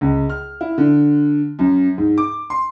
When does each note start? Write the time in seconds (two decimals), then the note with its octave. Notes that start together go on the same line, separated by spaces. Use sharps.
0.01 C#2
0.30 F6
0.61 E4
0.78 D3
1.59 F#2
1.98 G#2
2.18 D6
2.50 C6